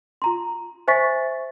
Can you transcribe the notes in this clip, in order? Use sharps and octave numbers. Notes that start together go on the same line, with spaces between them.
F4 A#5 C6
C5 E5 G#5 C#6 A6 B6